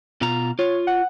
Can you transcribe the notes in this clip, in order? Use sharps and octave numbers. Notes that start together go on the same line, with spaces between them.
B2 F4 A#5
F4 C#5
F#5